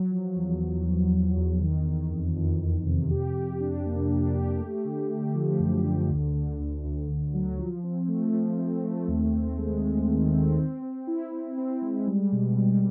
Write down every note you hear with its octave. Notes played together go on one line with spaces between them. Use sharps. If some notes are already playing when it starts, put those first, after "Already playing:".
Already playing: F#3
F3
E2
E2
E2
E2
E2
D#3
D#3
F2
F2
F2
C3
G4
G4
D4
A#3
D4
G4
A3
D3
A3
F3
F#2
D3
D2
D3
D2
D2
D2
F#3
F3
C4
A3
F3
C4
A3
D#2
C4
G#3
G#3
D#3
C4
C4
C4
E4
C4
C4
G#3
G3
B2
G3